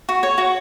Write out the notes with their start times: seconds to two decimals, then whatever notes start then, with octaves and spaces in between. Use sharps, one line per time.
0.09 F#4
0.23 C#5
0.38 F#4